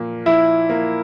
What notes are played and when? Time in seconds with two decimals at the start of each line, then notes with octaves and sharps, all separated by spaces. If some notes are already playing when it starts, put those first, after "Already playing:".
Already playing: A#2 F3 A#3
0.26 F3 E4
0.69 A#3